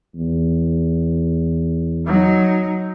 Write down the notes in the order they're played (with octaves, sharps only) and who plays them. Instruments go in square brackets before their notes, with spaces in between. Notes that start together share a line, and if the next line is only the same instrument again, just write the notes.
[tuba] E2
[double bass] F#3 D#4